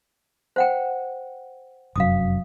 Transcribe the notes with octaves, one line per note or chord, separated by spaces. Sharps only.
C5 F#5 G5
F1 F#2 F#3 F5 D#6